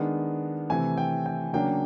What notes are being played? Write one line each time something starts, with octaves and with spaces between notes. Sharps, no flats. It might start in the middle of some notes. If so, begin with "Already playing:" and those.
Already playing: D#3 G#3 B3 D4
C3 E3 A3 C4 G#5
G5
G5
C#3 F#3 A#3 D4 G5